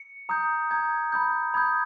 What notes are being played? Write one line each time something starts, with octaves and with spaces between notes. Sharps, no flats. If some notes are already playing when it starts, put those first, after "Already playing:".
Already playing: C#7
A#5 D#6 G6
A#5 D#6 G6 G#6
B5 D#6 G6
B5 D#6 G6 G#6